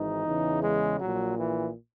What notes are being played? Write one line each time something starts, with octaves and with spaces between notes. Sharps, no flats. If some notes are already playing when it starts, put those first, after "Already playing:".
Already playing: G#1 G#2 E3 D#4
E2 C#3 E3
G#3
A#1 A#2 F#3
E3